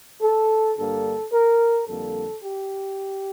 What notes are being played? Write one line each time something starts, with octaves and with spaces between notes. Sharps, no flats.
A4
G2 D3 G3 A#3 A4
A#4
F2 D3 G3 A#3 A4
G4